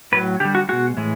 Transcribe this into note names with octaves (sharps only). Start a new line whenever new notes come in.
A2 F#3 B4
D3 G3 G4
F#4
B2 G#3 F#4
A2 E3 G#3